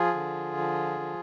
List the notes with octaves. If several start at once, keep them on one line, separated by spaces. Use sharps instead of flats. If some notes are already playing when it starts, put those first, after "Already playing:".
Already playing: F3 F4 G#4
D3
F3
F3